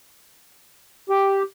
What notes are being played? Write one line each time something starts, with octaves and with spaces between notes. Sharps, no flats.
G4